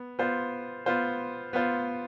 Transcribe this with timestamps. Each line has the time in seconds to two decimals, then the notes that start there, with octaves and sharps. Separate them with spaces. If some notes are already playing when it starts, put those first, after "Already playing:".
Already playing: B3
0.19 B3 F4 C5
0.86 B3 F4 C5
1.53 B3 F4 C5